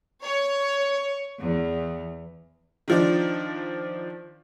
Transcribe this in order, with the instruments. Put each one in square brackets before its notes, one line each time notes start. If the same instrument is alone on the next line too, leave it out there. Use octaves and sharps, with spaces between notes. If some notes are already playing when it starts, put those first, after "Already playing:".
[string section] C#5
E2
[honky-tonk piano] D#3 F3 D4